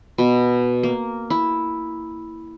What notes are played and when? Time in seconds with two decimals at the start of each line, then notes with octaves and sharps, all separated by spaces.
0.18 B2
0.83 A#3
1.30 E4